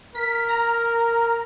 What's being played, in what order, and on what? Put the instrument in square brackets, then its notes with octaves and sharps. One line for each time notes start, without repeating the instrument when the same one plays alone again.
[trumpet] A#4 [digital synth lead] B6
[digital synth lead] A#5